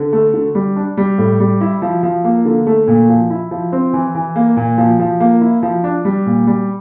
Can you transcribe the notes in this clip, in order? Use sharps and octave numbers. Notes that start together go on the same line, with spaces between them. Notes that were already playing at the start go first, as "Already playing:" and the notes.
Already playing: D3
A3
D3
G3
D4
G3
A2
G3
E4
F3
F3
A#3
D3
A3
A#2
F3
E4
F3
C4
E3
E3
A#3
A#2
F3
F3
A#3
E4
F3
D4
G3
A#2
G3